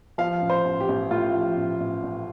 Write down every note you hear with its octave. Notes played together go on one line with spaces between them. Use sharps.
F3 F5
A1
C5
A1
G4
A1
A2 F4
F3
A1
A1
A1